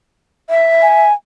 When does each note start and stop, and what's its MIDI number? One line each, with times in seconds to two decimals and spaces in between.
0.49 1.06 76
0.82 1.13 80